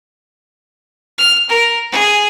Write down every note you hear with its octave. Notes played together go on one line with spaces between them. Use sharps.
F6
A#4
G#4